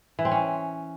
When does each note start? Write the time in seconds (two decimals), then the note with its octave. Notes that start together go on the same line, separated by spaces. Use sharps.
0.19 E3
0.25 C4
0.32 C#4